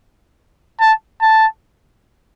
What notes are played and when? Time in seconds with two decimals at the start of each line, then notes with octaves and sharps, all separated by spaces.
0.80 A5
1.21 A5